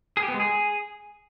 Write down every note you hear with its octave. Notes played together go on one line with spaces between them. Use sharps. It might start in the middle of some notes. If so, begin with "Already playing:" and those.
G#4
G4
B3
G#3
G#4